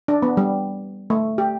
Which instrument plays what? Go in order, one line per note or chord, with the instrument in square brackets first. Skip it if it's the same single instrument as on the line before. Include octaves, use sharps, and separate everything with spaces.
[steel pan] D4
B3
G3
A3
G4